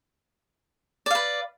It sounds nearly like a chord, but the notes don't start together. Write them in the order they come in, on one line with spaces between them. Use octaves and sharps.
D5 F5 B4